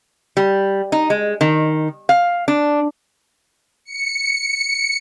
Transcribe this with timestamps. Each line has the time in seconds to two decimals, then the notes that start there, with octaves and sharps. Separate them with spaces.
0.37 G3
0.92 D#4
1.10 G#3
1.41 D#3
2.09 F5
2.48 D4
3.84 C#7